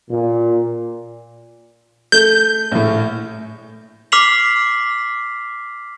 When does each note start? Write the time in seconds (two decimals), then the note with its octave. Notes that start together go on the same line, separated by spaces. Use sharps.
0.11 A#2
2.12 A3 G6
2.72 A#1 A2
4.12 D6 F6 B6 C7 F7 F#7